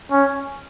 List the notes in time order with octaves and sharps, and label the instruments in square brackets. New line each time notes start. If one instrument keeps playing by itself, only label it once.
[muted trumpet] C#4